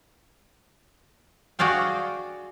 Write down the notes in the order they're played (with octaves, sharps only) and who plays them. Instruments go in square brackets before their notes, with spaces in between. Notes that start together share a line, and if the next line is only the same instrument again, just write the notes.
[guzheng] F#4 G#4 D5 F5 G5